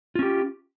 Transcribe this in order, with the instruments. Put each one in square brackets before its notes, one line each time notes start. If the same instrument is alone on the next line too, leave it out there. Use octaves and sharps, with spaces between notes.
[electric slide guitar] F4
C#4
G4